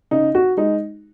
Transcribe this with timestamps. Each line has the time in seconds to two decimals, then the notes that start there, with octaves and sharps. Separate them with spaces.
0.11 C#3 D#4
0.35 F#4
0.57 G#3 D#4